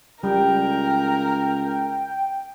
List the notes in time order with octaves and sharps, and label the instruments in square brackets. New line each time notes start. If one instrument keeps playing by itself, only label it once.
[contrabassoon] C#2 [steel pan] G3 [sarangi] A#4 [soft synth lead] G5